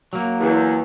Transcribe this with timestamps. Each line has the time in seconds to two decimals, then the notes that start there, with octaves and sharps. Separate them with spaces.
0.13 F#3 A#3
0.40 E2